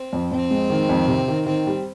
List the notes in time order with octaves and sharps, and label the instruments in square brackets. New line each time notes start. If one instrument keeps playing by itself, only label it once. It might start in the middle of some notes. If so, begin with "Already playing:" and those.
Already playing: [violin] C4
[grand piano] F2
[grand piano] F2 [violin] C4
[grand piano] G#3
D#3
F2
C3
D#3
[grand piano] D#3 [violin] C4
[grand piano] G3